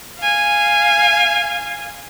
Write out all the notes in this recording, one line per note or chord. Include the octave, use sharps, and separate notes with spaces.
F5 G#5